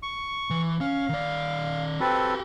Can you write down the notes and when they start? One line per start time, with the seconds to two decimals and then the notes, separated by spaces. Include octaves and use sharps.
0.03 C#6
0.50 E3
0.81 C#4 F5
1.09 D#3 D5
2.00 C4 F#4 G4 A4 B4